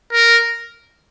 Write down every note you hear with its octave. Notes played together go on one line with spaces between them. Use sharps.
A#4